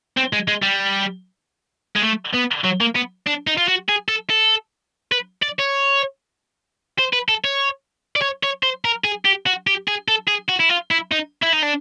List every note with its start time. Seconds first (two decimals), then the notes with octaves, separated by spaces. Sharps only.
0.17 C4
0.33 G#3
0.48 G#3
0.63 G3
1.96 G#3
2.02 A3
2.34 B3
2.64 F#3
2.81 A#3
2.95 B3
3.27 D4
3.47 D#4
3.58 F4
3.68 F#4
3.89 G#4
4.09 A4
4.30 A4
5.12 B4
5.43 D5
5.59 C#5
6.99 C5
7.13 B4
7.29 A4
7.44 C#5
8.16 D5
8.22 C#5
8.43 C#5
8.63 C5
8.85 A#4
9.04 G#4
9.25 G4
9.46 F#4
9.67 G4
9.88 G#4
10.08 A4
10.28 G#4
10.49 F#4
10.60 E4
10.70 F4
10.91 E4
11.12 D#4
11.43 E4
11.53 D#4
11.63 D4